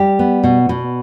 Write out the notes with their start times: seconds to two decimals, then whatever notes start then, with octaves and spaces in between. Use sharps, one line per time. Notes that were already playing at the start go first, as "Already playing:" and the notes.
Already playing: G3 G4
0.19 B3
0.43 B2
0.69 B2